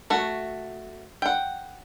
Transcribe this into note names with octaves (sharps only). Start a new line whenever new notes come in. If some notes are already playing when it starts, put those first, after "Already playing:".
A3 F#4
F#5 G5